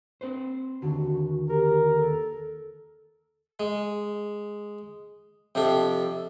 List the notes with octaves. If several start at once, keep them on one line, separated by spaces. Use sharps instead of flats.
C4 B4 C5
D#2 D3 F#4
G4 A#4
A4
G#3
F2 C3 D4 A4